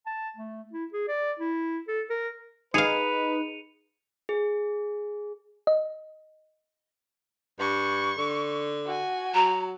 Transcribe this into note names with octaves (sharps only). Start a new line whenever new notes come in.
A5
A3
E4
G#4
D5
E4
A4
A#4
D#4 G#4 B4 F5 C#7 D#7 F7
G#4
D#5
G2 C#6
D3
F#4 G#5
F#3 A#5